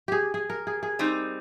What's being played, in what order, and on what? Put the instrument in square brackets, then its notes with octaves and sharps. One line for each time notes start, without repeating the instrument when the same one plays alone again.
[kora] G4 G#4
G#4
A#4
G#4
G#4
[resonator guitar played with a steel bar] G3 C4 D#4